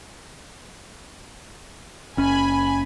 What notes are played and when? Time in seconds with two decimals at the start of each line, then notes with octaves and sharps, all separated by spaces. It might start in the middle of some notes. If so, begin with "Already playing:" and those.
2.17 F#1 C#4 G#5 B5